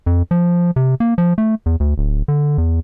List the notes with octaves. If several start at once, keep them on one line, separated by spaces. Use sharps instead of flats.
F2
F3
C3
A#3
F3
A3
E2
D2
D1
D3
E2